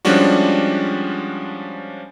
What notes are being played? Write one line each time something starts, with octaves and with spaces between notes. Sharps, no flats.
F3 G3 G#3 C#4 D4 F#4